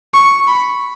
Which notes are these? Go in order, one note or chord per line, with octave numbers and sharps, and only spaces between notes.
C#6
B5